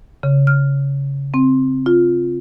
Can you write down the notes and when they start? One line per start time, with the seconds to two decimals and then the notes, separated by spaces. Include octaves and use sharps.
0.23 C#3
0.47 F6
1.34 C4
1.86 F4